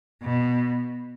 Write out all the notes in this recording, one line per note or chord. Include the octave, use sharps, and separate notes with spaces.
B2